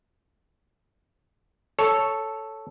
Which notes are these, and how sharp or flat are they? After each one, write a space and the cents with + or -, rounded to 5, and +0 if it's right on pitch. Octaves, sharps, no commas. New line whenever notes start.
A4 +0 C#5 +0